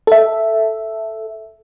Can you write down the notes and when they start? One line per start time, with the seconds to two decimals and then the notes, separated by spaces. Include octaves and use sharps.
0.07 A4 E5